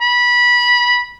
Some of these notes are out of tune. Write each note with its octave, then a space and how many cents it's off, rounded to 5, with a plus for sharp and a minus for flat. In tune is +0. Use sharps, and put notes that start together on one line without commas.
B5 -20